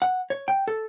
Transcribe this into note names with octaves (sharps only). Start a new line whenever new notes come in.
F#5
C#5
G5
A4